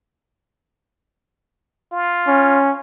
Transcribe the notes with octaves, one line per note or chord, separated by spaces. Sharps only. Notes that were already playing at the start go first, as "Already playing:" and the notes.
F4
C#4